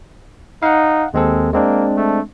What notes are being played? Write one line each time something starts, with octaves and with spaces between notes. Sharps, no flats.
D#4 F5 F#5
D#2 G#3 C4 A4
G#3 A#3 C4 D4
A3